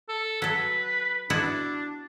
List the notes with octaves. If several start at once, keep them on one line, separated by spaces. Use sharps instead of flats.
A4
F#3 A4 B4
B3 D4 E4 F#4